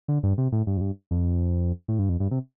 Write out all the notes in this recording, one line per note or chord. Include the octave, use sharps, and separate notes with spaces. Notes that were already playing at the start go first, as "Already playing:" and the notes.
D3
G2
C3
A2
G2
F2
G2
F2
A2
G2
F2
G2
C3